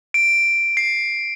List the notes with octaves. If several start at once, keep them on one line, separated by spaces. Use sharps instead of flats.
D7
C7